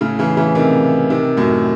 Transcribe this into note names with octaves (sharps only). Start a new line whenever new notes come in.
A2 C#3
C#3 E3
C#3 E3
C3 D#3
C3 D#3
F#2 A2